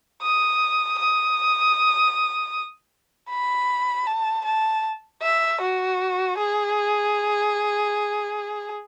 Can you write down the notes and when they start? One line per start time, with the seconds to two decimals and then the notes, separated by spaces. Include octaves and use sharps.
0.22 D#6
0.99 D#6
3.30 B5
4.07 A5
4.45 A5
5.22 E5
5.61 F#4
6.38 G#4